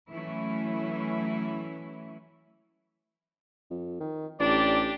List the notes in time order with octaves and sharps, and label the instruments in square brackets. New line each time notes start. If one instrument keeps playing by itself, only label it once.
[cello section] E3 F#3 A3 C#4 E4
[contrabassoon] F2
D#3
[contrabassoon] A1 [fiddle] D4 G4 [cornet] D5